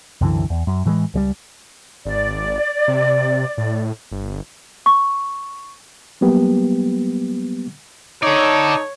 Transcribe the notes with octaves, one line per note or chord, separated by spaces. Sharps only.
C2 F#2 D3 E3
E2
F#2
A2 E3 F3 G#3
C#2 F#3 G3
G#1 D5
C3
A2
G1
C#6
F#3 G3 A#3 B3 G4
D#4 A4 C#5 D5